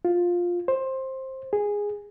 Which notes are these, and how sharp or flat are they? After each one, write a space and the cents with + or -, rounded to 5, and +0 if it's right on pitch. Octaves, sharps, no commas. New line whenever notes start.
F4 +10
C5 +15
G#4 -10